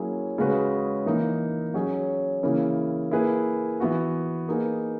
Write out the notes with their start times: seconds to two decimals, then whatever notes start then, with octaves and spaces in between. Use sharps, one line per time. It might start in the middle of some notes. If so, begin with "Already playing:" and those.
Already playing: F#3 A#3 C#4 E4 G#4
0.38 C#3 G#3 C#4 F#4 B4
1.06 E3 A#3 D#4
1.74 F#3 C#4 G#4
2.43 C#3 E3 A#3 E4
3.11 A#3 E4 G#4 B4
3.80 E3 B3 F#4
4.48 A#3 D#4 G#4 B4